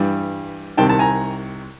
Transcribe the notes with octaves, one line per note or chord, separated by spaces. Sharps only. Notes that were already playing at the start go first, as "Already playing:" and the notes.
Already playing: G2 E3 G3
C2 C3 D#3 G5 A5
A5
G#5 A#5